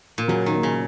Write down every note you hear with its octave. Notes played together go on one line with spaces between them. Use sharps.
A#2
C#3 F#3
D#3
A#3
C#3